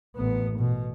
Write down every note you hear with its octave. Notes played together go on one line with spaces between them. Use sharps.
A1 B3
B2